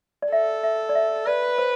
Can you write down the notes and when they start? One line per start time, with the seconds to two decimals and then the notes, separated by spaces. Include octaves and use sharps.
0.22 D5
0.31 A4 E5
0.63 E5
0.89 D5
0.95 E5
1.26 B4 D5
1.58 C5